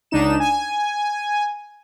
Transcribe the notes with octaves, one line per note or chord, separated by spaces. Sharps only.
C#2 D4 D#4 E7
G#5